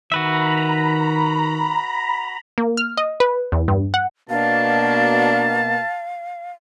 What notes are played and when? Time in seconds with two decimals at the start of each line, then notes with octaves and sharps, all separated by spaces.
0.12 D#3 F#4 B4 E5 A#5 B5
2.58 A#3
2.77 F6
2.97 D#5
3.20 B4
3.52 E2
3.68 G2
3.94 F#5
4.30 B2 A#3 D4 F5 A5